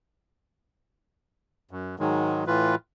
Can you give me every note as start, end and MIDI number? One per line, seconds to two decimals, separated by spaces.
1.71 1.95 42
1.99 2.44 44
1.99 2.44 51
1.99 2.44 54
1.99 2.44 56
2.47 2.75 45
2.47 2.75 52
2.47 2.75 65
2.47 2.75 71